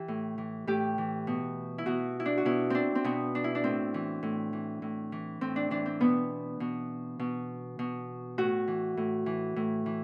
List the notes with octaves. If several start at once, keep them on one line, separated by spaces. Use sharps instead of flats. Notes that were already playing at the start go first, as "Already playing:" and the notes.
Already playing: E3 G4
A2
E3
A2 G4
E3
B2
E4
B2 F#4
E4
D4
F#4
B2 E4
C4 D4
C4
B2 B3
D4
E4
D4
A2 C4
E3
A2
E3
A2
E3
A2 C4
D4
E3 D4
C4
B2 B3
B2
B2
B2
A2 F#4
E3
A2
E3
A2
E3